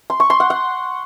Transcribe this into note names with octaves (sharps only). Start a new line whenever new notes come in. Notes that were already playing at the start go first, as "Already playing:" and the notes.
C6
C#6
C6
F#5
F#5